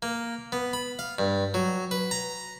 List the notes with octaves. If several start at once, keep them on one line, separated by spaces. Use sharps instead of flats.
A#3
B3
B5
F5
G2
F#3
B4
A#5